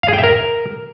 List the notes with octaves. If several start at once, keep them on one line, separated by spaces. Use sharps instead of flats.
F5
G#4
G5
E5
A#4